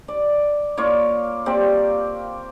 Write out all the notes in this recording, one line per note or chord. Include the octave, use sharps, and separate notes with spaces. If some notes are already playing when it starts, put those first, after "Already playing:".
D5
A#3 F4 C#5 D5
A#3 C4 G4 D5